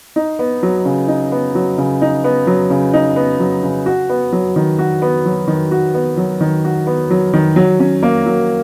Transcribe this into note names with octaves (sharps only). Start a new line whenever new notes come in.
D#4
B3
F#3
C#3
D#4
B3
F#3
C#3
D#4
B3
F#3
C#3
D#4
B3
F#3
C#3
F#4
B3
F#3
D#3
F#4
B3
F#3
D#3
F#4
B3
F#3
D#3
F#4
B3
F#3
D#3
F#3
C#4
A#3
F#3